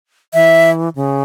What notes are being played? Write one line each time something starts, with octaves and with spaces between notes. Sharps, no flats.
E3 E5
C#3